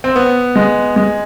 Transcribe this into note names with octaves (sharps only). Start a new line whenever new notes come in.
C4
B3
G#3
G#3